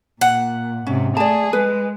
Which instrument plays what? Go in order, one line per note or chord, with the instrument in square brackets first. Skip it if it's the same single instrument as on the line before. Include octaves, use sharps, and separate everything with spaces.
[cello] A#2 [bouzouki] F#5
[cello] G#2 C3 [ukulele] C#4
[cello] A3 G#4 [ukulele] D5 A5
[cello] G#3 [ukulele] B4